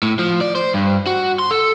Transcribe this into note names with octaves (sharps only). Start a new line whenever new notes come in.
A2
F3
D5
C5
G2
F#4
C6
A4